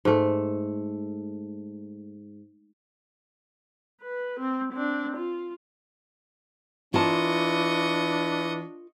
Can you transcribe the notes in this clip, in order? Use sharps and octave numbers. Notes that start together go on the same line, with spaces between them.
G#2 A3
B4
C4
C4 D4
F4
E3 D4 F4 A#4 D#5 A5 C#6